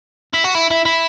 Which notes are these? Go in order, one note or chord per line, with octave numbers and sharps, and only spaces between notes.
E4
F#4
E4
E4
E4